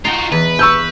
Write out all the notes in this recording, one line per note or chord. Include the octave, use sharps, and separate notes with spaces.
D#4 F4 F#4 G5 A#5
E2 B4
C#6 E6 G6